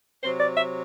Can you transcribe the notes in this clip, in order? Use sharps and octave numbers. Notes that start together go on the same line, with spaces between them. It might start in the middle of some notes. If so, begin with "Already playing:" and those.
C3 F#3 C5
D5
E5